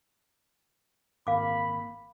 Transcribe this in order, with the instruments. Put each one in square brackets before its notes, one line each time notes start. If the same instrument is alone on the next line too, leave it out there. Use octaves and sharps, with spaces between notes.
[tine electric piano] G#1 A#3 [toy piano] F5 D6 [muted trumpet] B5